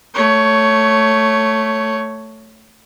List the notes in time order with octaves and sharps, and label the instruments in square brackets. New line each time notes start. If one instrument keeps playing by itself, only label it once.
[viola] A3 C#5